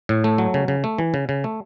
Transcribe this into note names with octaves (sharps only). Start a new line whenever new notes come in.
A2
A3
F#3
C#3
C#3
A3
E3
C#3
C#3
A3